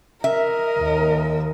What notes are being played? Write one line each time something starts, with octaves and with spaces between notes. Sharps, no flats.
A#4 D#5 E5
D#2